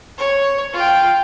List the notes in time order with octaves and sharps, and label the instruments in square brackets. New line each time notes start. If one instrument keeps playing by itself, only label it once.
[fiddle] C#5
F4 G5